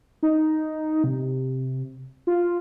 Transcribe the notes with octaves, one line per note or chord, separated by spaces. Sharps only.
D#4
C3
F4